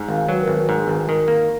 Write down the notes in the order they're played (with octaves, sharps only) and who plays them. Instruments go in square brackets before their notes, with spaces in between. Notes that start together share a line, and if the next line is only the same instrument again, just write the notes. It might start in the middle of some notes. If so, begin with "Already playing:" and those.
Already playing: [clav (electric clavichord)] G#2
[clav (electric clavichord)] G#1 [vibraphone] F5
[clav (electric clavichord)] F#3 [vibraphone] B4
[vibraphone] A#4
[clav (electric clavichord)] G#1 [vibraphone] B4
[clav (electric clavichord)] G#2 [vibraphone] A#4
[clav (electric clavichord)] G#1 [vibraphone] B4
[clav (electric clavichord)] D#3 [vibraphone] A#4
[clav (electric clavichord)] A#3